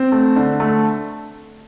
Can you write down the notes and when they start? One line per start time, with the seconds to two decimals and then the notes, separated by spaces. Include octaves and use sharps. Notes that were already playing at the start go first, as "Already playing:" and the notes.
Already playing: C4
0.12 A3
0.36 D3
0.60 A3